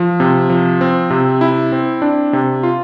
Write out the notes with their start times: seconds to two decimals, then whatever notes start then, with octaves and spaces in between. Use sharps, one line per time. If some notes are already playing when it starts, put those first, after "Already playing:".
Already playing: F3
0.20 C3
0.50 F3
0.81 C4
1.10 C3
1.41 E4
1.72 C4
2.02 D4
2.33 C3
2.63 F4